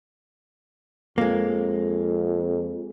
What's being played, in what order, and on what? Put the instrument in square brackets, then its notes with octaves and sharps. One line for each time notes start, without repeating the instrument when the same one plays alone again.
[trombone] F2 [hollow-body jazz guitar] G#3 A#3